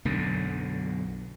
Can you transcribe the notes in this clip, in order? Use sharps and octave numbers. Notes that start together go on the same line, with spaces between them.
B1 F#2 D3